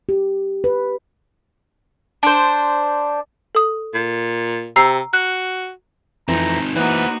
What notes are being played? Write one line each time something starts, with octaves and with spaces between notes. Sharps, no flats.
G4
B4
D4 C5
A4 D#6
A#2
C3 A#5 E6 C7
F#4 F#6
F2 E3 C4 D#4 A#5
E3 A#3 D#4 F#4 B4 C5 F#5